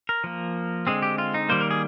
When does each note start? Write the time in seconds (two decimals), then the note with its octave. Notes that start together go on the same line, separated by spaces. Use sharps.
0.09 A#4
0.24 F3 A#3
0.87 D3 G#3 C4 G#4
1.02 G4
1.18 F4
1.34 D#4
1.49 D#3 G3 A#3 C5
1.61 A#4
1.71 G#4